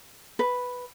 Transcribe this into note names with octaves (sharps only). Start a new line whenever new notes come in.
B4